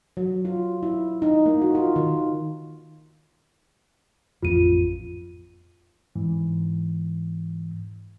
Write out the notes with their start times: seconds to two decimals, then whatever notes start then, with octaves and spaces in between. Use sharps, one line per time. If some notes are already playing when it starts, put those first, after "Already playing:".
0.17 F#3
0.45 F4
0.83 E4
1.22 D#4
1.46 A#3
1.61 F#4
1.75 F4
1.96 D#3
4.42 A1 F2 B3 F4 D#7
6.15 G#2 E3